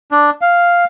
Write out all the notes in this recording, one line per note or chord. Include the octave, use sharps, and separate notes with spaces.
D4
F5